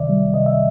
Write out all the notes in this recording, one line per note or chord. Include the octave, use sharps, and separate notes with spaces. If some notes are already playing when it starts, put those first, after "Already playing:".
Already playing: C#2 C3 D#3 D5 E5
G3
C3 D#5
E5